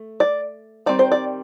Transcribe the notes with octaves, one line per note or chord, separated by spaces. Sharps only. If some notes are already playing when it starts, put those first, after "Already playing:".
Already playing: A3
D5
D#3 G3 C4 D5
C5
D5